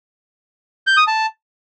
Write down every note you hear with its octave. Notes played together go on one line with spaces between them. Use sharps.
G6
D#6
A5